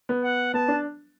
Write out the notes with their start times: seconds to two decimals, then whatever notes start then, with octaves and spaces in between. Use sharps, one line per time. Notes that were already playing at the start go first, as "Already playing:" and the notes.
0.09 B3
0.23 F#5
0.54 B3 A5
0.68 D4